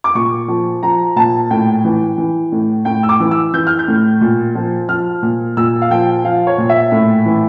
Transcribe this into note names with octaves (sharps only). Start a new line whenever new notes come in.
D6
A#2 C#6
F3
F3 A#5
A#2 A5
A2 G5
E3
E3
A2
A2 G5
E6
D6
E3
E6
E3 G6
F6
G6
A2
A#2
F3
F3 F6
A#2
A#2 E6
F5
F3 G5
F3 F5
C#5
A#2
E5
A2
E3